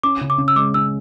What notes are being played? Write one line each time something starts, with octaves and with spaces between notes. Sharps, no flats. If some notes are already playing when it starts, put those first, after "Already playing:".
C#4 D6
C#3
D6
C#3
E6
G#3 D6
C#4 E6